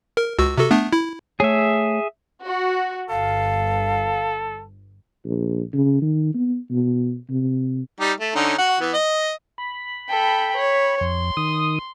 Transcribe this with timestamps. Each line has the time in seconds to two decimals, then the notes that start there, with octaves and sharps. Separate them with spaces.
0.17 A#4
0.39 C#2 F#4 E6
0.58 C3 F#4 A4
0.71 A3 B3 D4
0.93 E4
1.40 A3 G#4 C#5 E5
2.44 F#4
3.10 G1 A4 F5
5.25 A#1
5.73 C#3
6.02 D#3
6.34 B3
6.71 B2
7.30 C3
8.00 G3 D#4 G4
8.20 A3
8.35 D3 C#4 D#4
8.58 F#4 F#5
8.80 E3 B3
8.94 D#5
9.58 B5
10.09 A4 G5
10.56 C#5
11.01 F2 C6
11.37 D#3 D#6